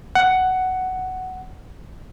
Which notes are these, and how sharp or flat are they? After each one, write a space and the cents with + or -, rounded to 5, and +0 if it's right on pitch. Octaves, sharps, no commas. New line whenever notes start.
F#5 +10